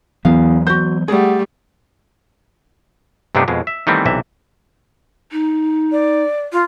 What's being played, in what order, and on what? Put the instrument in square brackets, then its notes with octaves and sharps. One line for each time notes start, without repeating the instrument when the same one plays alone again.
[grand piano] E2 [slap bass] E3 F#3 B3 [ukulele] F5
[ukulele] F#4 C5 [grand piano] G6
[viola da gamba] G3 A3 [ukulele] G#4 F#5
[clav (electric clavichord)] G2 C3 A3 B3 D4 D#4
F2 B2 G#3
E5
D#3 E3 G3 A3 B3 C4
B1 C3 E3 E5
[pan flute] D#4
[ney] D5
F4